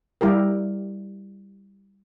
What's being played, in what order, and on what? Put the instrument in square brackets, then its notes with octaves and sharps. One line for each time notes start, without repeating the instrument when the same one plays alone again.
[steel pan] G3 E4 G4 A#4